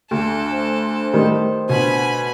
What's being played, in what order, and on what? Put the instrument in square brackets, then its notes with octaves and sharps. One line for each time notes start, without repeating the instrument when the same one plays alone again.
[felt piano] D2 D3 [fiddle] A4
[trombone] C5
[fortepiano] A2 D#3 G3
[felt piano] B2 D3 [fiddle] G#5 B5